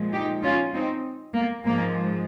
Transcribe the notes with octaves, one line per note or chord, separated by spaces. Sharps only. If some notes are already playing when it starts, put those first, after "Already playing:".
Already playing: A#2 F3 G#3
D#4 G4
C#4 F4
C4 D#4
A#3
G#2 F3 G#3 A#3